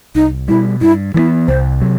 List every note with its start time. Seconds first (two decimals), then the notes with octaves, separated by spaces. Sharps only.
0.15 C2 D#4
0.48 B2 G3 E4
0.81 G2 E4
1.14 E3 G3 B3 E4
1.48 C2 C5
1.81 C3 F#3